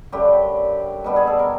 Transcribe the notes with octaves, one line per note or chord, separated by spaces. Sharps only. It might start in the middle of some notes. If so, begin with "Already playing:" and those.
F#2 D3 G3 G4
B2 G3 B3 D4
G#4
A4
A#4